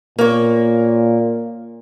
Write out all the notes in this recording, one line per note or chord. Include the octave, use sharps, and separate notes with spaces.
A#2 A#3 C#5